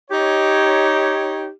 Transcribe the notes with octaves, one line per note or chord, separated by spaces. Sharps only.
D#4 G4 C#5